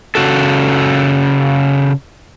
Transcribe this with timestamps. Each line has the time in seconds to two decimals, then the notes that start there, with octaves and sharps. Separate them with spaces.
0.15 C#3 F#4 A4